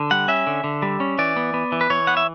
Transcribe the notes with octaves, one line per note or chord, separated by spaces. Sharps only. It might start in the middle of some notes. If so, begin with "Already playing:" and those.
Already playing: D3
G3 F#5
C#4 E5
D3
D3
G3
C#4
E3 D5
B3
B3
E3
B4
E3 C#5
B3 F#5
E5